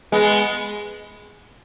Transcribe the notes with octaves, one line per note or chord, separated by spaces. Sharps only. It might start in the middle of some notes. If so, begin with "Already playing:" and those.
G#3 B3